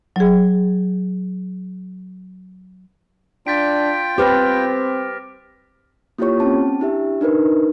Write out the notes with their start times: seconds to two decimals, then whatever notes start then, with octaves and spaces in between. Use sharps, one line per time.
0.16 F#3 G#4
3.47 D4 F4 G5 A6 B6 D7
4.18 C4 G4 B4 C5 D6 F6 A#6
6.18 A#3 E4 F4 G4 C#5 C#6
6.40 C4 C#4 A5
6.80 D4 E4 G4 E5
7.21 D4 D#4 A#4 B4